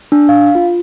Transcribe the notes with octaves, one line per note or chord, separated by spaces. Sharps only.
D4
F5
F4